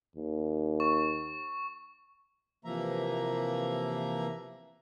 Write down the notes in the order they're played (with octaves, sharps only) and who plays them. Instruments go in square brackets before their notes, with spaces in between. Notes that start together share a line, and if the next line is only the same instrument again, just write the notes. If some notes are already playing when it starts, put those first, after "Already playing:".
[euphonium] D#2
[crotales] C#6
[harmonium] C3 E3 F3 A#3 E5 A#5